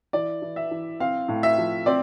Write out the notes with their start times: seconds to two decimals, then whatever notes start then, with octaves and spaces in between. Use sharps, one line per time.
0.13 E3 D5
0.42 E3
0.56 E5
0.71 E3
1.00 C4 F5
1.28 A2
1.43 E5
1.58 F3
1.86 C4 D5